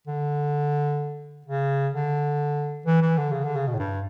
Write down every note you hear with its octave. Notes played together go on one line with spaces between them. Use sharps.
D3
C#3
D3
E3
E3
D3
C#3
D3
C#3
B2
A2
G2